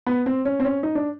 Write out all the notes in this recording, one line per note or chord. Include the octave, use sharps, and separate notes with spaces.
B3
C4
C#4
C4
C#4
D#4
D4